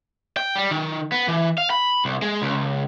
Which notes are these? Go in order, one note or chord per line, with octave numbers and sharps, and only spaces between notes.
G5
G3
D#3
B3
E3
F5
B5
C2
G#3
C#2